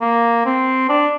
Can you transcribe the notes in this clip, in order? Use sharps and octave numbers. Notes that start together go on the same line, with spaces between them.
A#3
C4
D4